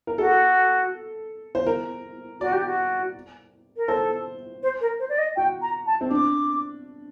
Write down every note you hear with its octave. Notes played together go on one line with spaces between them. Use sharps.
A#4
F#4 A4
C5
A#4
F#4 D5
G4
F#4
A#4
A4 C5
C5
A#4
C5
D5
D#5
F#4 G5
A#5
A5
C4
D4 D6